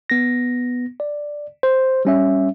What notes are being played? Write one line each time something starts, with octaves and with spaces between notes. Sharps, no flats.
B3 A#6
D5
C5
G3 C#4 E5